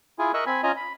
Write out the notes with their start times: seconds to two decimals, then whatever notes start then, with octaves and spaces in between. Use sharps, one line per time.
0.19 E4 F4 G#4 G#5
0.34 A#4 D#5 E5 C#6 E6 F#6
0.46 C4 G#5 B5
0.63 C#4 F4 D#5 G#5 A#5
0.77 B5